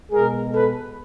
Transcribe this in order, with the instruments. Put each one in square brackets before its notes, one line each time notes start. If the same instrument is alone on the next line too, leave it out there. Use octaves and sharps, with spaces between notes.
[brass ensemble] B2 G#3 G#4 A#4
A4 B4